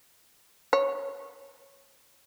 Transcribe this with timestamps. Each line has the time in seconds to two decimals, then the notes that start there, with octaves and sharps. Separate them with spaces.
0.73 C#5